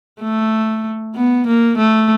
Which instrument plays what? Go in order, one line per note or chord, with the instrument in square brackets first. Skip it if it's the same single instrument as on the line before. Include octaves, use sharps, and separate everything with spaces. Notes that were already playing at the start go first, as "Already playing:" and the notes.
[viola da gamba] A3
B3
A#3
A3